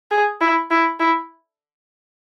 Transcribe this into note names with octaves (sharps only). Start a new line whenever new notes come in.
G#4
E4
E4
E4